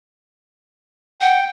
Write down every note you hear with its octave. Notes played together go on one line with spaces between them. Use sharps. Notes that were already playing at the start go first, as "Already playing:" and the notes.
F#5 G5